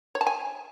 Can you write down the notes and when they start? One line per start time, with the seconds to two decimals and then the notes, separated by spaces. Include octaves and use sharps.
0.15 C#5
0.21 A5
0.27 G#5